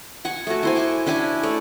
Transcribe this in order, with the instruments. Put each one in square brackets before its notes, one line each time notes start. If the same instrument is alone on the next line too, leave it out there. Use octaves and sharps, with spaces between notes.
[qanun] F#5 G#5 C#6
A3 F#4
E4 C5 G#5
C#6 D6
C#4 D4 E4 G#5
A3 C#5 D5